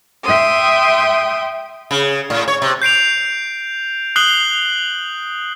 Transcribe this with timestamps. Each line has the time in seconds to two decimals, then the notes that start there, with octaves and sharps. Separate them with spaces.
0.23 E5 G5 C6 D#6
1.91 C#3
2.30 A2
2.48 C#5
2.62 C3
2.82 G6 C7 D7 F7
4.16 D#6 F#6 C7 F#7 G7